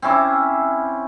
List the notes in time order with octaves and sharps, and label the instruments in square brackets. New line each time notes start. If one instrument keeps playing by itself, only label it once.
[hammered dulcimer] C4 C#4 E4 D6